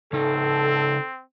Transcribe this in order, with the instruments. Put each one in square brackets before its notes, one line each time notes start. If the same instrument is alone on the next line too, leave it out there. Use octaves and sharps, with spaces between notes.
[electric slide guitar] C#3 D#4 [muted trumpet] C4 [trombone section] A4